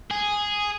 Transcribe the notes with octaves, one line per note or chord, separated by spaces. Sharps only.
G#4